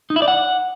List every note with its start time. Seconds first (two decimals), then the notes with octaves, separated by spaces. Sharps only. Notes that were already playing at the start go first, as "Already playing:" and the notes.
0.10 D#4
0.16 E4
0.22 D5
0.28 F#5